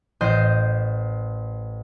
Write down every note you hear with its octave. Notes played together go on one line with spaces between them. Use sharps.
A1 C5 D#5 G6